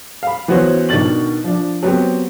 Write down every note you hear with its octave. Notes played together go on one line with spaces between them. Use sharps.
F5 B5
E3 B3 C#4 F#4 C5 C#5
B2 D#3 D4 A6 F#7
F3 D4
F#3 B3 C4 G4